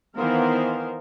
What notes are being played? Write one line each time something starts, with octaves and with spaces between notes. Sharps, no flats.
D#3 E3 B3 A#4 C5 F5